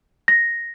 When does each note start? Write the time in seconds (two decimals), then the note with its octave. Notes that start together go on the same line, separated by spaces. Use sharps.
0.28 A#6